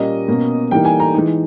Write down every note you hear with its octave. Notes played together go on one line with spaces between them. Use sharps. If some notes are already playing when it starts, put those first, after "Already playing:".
Already playing: A#2 G3 A#3 C#4 D#5
B2 A#3 C#4
E3 G3 A#3 D#4 G5
G#5
A#5
E3 G#3 D#4